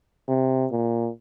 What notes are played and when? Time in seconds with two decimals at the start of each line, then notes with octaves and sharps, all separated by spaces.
0.28 C3
0.72 A#2